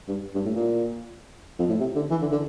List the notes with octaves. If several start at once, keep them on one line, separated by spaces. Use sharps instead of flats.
G2
G2
A2
A#2
F2
A2
C3
D3
E3
D3
D3